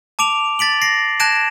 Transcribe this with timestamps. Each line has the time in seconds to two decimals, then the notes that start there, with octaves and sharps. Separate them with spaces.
0.19 A5 D6 D7 F7
0.59 A6 B6 D7 F#7
0.82 A#6 C7 D7
1.20 A5 F#6 G#6 A#6 D7 E7